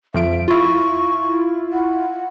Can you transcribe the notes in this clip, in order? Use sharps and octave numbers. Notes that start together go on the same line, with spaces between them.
F2 F3 E5 D7
E4 F4 C#6
F#5